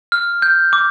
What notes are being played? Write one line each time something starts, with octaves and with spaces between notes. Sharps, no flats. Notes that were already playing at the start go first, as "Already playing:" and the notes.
F6
G6
D6